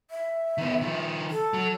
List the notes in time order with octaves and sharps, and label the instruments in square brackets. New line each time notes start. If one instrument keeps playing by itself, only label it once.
[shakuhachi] E5
[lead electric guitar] D#3 B3
D#3 F3
[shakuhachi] A4
[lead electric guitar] F#3